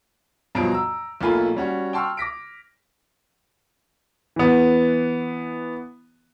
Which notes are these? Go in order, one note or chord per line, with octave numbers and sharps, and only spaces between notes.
G2 B2 F3 F#3 D7
A#5 E6
B1 A3 A#3 F4 G#5 B5
G3 C#4 F#4
G5 A5 C6 C#6 E6 F6
D6 A#6 B6 D7
E3 B3